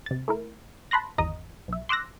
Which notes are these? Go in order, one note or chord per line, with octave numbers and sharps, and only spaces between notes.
C3 A6
A3 E4 A#4
A5 B5 C6 F#6 A#6
G#1 E2 D#5 A#5 D#6
B1 E5
C6 D6 E6 F#6 A#6